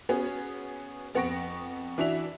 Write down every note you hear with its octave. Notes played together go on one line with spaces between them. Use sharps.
B3 C#4 F#4 G#4
F2 B3 F#5 C#6 A#6 D7
E3 D4 F#4 E5 F7